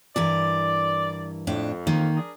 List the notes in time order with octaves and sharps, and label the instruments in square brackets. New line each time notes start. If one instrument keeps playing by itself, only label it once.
[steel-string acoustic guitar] G2 E3 A#4 [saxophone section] D5
[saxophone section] F2 [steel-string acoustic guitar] A2 D4
[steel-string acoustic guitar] D#3 A#3
[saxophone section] D4 G#4 A#4